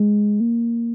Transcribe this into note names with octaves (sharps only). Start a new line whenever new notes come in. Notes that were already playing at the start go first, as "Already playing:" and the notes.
Already playing: G#3
A#3